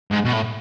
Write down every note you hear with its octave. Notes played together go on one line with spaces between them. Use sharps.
G#2
B2
A2